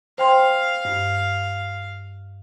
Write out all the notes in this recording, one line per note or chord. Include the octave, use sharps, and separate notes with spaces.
C5 F5 G5 C6
G2